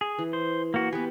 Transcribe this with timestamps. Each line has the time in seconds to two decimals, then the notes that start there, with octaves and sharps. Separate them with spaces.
0.01 G#4
0.19 E3
0.33 C5
0.74 A#3 F#4
0.93 B3 G4 B4 G#5